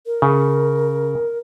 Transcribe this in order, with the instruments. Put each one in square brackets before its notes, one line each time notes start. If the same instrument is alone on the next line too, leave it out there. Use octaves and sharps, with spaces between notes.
[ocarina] A#4
[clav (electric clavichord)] C#3